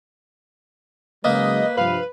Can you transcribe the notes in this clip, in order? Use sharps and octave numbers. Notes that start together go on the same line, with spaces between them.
C#3 F#3 G#3 A#3 B4 D#5
G2 C3 F3 B4 F5